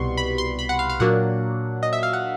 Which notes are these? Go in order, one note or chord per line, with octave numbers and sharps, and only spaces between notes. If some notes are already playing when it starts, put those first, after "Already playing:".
Already playing: C2 B2 G3 B3 C6 C#6
B5
C6
B5
F#5
F5
F5
A#2 F#3 A#3 D4 F#5
D#5
E5
F5
F#5